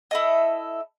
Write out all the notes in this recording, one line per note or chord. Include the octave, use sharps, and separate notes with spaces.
E4 A4 D#5